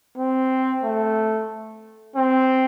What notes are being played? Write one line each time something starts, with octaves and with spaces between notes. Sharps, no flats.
C4
A3
C4